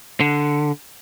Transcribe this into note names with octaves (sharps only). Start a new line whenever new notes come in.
D3